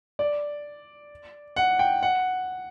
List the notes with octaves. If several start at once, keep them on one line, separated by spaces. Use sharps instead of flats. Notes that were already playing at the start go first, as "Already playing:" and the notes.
D5
F#5
G5
F#5